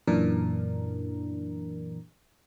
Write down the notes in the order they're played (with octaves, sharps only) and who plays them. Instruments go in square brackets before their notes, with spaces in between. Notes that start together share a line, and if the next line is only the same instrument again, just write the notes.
[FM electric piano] F#2 A#2 E3 D4 A#4